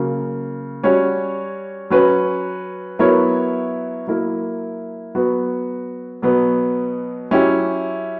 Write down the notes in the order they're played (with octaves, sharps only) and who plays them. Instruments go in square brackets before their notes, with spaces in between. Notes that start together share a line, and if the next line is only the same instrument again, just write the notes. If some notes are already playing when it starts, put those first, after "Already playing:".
Already playing: [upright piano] C#3 F#3 A#3
G3 C#4 F#4 C#5
F#3 C#4 F#4 B4
F#3 B3 E4 A#4 C#5
F#3 A#3 E4 A#4
F#3 B3 F#4
B2 F#3 B3
F#3 C#4 E4 G4